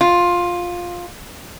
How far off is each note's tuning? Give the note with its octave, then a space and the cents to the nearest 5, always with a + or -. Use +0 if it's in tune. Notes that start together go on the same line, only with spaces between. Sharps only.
F4 +10